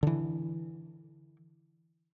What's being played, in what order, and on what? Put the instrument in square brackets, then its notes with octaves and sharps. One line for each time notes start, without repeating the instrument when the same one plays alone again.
[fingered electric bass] D3 E3